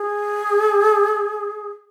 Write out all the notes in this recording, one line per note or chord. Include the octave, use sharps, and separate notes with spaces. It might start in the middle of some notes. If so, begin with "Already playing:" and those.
Already playing: G#4